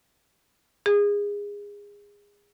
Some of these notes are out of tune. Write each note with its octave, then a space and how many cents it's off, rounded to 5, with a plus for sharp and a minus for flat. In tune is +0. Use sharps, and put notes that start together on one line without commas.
G#4 -25